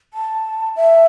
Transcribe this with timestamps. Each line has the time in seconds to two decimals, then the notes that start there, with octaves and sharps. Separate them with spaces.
0.14 A5
0.76 E5